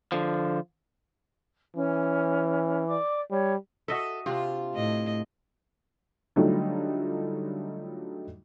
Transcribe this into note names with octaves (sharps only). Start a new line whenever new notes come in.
D3 F3
E3 C#4
D5 D6
G3 C#5
F#4 A4 D#5 E5
C3 D4 F4
A2 D#5
D3 F#3 G3 A3 D#4 F4